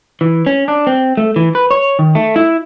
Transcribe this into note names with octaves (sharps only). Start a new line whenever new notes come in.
E3
C#4
D4
C4
A3
E3
B4
C#5
D#3
A3
E4